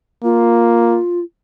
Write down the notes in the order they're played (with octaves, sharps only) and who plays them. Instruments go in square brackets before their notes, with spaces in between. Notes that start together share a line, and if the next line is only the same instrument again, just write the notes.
[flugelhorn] A#3 [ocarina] F4